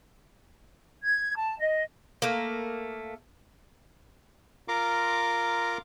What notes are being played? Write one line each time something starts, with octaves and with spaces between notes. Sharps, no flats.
G#6
A5
D#5
A3 A#3
F4 A#4 A#5 C6 D6